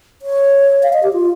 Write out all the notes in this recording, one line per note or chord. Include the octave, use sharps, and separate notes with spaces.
C#5
F5
D#5
G4
F4